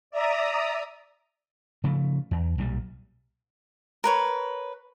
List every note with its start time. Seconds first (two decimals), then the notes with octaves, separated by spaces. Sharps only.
0.11 D5 E5 A#5 D#6
1.84 C#3 F3 A3
2.31 E2
2.58 B1 A#2 G3
4.04 A#4 B4 C#5